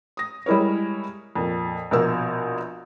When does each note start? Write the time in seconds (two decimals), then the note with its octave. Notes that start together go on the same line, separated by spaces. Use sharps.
0.17 D#6 A#6
0.46 G3 G#3 E4 A#4 C#5
1.35 F2 A#2
1.91 A#1 B2 A#4 E6